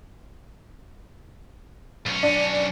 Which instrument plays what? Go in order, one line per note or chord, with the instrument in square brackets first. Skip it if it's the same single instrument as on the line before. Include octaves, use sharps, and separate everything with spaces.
[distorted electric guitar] B1 C#4
[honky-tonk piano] D4